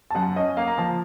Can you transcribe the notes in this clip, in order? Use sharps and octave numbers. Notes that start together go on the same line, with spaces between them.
A5
F#2 F#5
C#4 D#5
A#3 F5
A#5
F3 A5